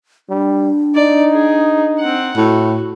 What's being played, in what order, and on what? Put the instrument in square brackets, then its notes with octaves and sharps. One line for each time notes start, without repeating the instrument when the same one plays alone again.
[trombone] G3 [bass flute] D4
[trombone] D#4 [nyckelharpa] D5
[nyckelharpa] G#4
C4 F#5
[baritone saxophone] A2 [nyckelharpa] F#4